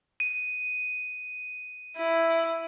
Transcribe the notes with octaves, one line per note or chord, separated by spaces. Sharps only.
D#7
E4